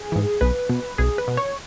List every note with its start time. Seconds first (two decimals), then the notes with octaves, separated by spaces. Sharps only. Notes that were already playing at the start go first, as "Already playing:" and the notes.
Already playing: G#4
0.12 G#2 E3
0.41 B1 B4
0.69 B2
0.98 B1 G#4
1.18 B4
1.28 B2
1.37 C#5